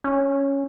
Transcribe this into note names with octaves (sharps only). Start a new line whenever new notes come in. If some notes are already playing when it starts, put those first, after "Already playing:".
C#4